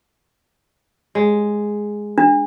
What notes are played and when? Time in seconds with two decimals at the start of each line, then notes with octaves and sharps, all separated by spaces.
1.15 G#3
2.18 D4